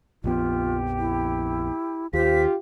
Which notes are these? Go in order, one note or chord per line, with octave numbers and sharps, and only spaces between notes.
A#1 F2 B3 F4 G4
E4
D#2 F4 G4 C5 B6